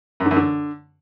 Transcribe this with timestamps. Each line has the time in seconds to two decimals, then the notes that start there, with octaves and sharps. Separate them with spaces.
0.20 F#2
0.25 D3
0.31 F#2
0.36 D3